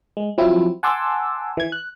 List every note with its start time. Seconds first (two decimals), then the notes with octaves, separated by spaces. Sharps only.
0.17 G#3
0.38 F3 F#3 C4 E4
0.83 F#5 G#5 A5 C6 D6 E6
1.57 E3 G#6
1.72 F#6